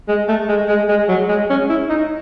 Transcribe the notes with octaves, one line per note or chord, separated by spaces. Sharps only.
G#3
A3
G#3
G#3
G#3
F#3
G#3
C#4
E4
D#4